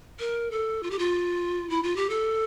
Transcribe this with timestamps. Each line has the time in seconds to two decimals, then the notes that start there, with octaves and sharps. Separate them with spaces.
0.19 A#4
0.51 A4
0.83 F4
0.91 G4
0.99 F4
1.70 E4
1.83 F4
1.96 G4
2.10 A4